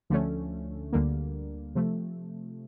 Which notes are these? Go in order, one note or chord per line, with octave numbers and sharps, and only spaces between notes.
D2 D3 F3 A3 C#4
D2 D3 G3 A#3
C3 F3 A3